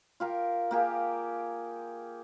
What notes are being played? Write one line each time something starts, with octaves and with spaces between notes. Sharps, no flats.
F4 G4 A#4
A#3 G4 G#4